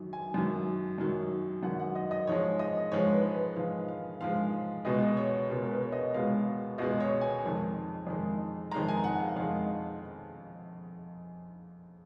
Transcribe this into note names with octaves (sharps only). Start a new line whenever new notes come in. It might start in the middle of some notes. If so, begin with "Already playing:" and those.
Already playing: F#2 D#3 F#3
G#5
F#2 D#3 F#3
F#2 D#3 F#3
F#2 D#3 F#3 F#5
F#5
D#5
D#5
G#2 F3 G#3 C#5
D#5
G#2 F3 G#3 C#5
B4
B4
G#2 F3 G#3 F5
F5
G#2 F3 G#3 F5
C#2 B2 G#3 D#5
C#5
C#2 B2 G#3 A#4
A#4
B4
C#5
D#5
C#2 B2 G#3 F5
C#2 B2 G#3 D#5
C#5
G#5
F2 D#3 G#3
F2 D#3 G#3
F2 D#3 G#3 A#5
G#5
F#5
F5
F2 D#3 G#3 F5